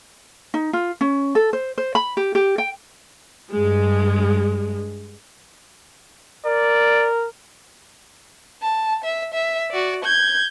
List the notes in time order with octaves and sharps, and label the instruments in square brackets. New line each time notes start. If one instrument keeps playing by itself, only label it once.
[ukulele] D#4
F4
C#4
A4
C5
C5
B5
G4
G4
G5
[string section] G2 G#3
[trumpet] A#4 [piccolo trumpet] D5
[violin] A5
E5
E5
F#4 D5
G6 G#6